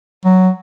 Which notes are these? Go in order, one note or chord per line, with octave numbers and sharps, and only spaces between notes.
F#3